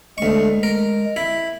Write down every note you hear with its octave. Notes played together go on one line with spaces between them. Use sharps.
D2 G#3 C#6
A#4
E4